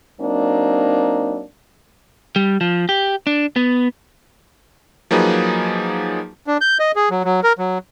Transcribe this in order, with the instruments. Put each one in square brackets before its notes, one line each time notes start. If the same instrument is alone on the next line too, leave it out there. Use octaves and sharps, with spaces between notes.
[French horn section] F#3 A#3 C4 D4 D#4
[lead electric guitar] G3
F3
G4
D4
B3
[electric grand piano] F3 F#3 A#3 D#4 G#4 B4
[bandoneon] D4
G6
D#5
G#4
F#3
F#3
A#4
F#3